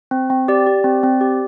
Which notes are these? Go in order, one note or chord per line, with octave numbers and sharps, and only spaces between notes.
C4
C4
G4 D5
G4
C4
C4
G4